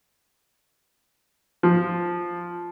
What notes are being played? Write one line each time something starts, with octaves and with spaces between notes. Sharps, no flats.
F3